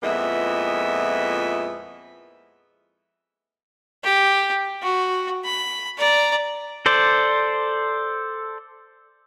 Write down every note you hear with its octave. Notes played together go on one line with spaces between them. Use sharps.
F2 A#2 G#3 B3 E4 E5
G4
F#4
B5
D5 A#5
A4 C5 D5